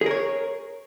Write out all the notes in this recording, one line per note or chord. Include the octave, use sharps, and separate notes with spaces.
G#4 A#4 C#5